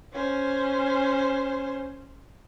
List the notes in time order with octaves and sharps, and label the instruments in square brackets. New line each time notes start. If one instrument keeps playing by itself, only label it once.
[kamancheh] C#4 C5